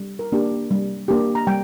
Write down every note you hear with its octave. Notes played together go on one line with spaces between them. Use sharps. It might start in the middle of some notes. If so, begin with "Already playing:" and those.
Already playing: G3
A#4
A#3 D4 G4
G3
A#3 D4 G4
A#5
G3 G5